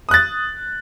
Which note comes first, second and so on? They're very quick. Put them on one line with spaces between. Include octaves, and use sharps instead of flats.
D#6 F#6 A6